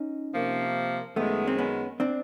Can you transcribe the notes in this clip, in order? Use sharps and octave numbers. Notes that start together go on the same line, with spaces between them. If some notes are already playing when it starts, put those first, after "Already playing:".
Already playing: C#4 D#4
C3 F3 A#3
F#2 D#3 G#3 A3 B3
C4
B3 C#4
C4 D4